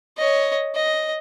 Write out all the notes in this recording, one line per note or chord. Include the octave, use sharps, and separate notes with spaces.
C#5 D#5
D#5